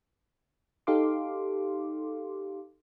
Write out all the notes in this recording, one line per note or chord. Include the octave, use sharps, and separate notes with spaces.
D#4 G4 A4 F5 C6 D6